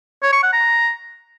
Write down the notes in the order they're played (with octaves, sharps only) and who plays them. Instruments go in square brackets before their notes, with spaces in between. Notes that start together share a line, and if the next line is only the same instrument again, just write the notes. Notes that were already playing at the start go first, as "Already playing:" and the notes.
[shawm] C#5
C#6
F#5
A#5